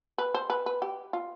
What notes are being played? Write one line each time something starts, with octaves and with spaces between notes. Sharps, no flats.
B4
C5
B4
B4
G4
F4